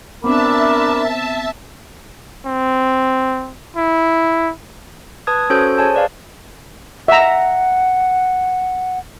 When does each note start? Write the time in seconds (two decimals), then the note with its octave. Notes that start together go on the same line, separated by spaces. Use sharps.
0.24 B3 C4 D4 A#4 E5 A5 B5 D6
2.46 C4
3.77 E4
5.27 B4 A5 D#6 G#6
5.50 C#4 F#4 A4 C5 C#5 G6
5.78 G#4 C5 C#5 G#5 A5
5.94 B4 D5 F5
7.08 E5 F#5 A#5